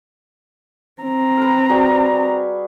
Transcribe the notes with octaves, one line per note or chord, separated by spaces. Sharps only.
C4 A#5
A#4 B4
G3 F#4 G#4